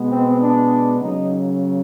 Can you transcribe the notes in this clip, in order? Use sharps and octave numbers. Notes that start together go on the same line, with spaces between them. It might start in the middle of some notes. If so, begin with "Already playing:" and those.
Already playing: B2 G#3 B3
C4
D4
C#3 F#3 A#3 D#4